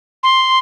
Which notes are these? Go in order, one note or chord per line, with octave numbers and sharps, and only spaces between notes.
C6